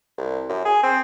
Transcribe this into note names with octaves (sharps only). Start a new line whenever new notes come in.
C2
F#2
G#4
C4